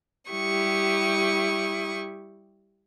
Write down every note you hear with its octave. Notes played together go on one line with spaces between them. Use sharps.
G3 E4 G4 C#6 D#6